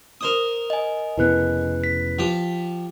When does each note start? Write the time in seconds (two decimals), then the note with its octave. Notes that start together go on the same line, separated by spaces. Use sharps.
0.21 A#4 C5 D#6
0.70 D#5 G#5
1.18 F1 C#3 B3 E4 B4 F#6
1.84 B6
2.19 F3 G4